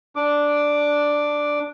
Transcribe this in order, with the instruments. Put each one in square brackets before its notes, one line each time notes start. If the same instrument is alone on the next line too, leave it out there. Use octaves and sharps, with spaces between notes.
[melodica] D4 D6